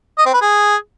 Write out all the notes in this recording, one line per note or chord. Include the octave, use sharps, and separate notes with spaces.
D#5
C4
B4
G#4